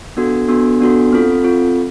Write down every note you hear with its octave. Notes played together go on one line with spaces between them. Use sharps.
B3 D4 F#4 A4
B3 D4 F#4 A4
B3 D4 F#4 A4
C4 F4 A4
C4 F4 A4